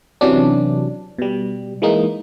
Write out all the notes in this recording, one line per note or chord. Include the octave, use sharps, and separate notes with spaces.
C3 E3 F#3 C#4 D4
B2 G3
E3 G#3 A#3 D#4